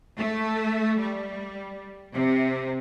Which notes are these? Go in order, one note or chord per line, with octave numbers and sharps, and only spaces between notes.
A3
G3
C3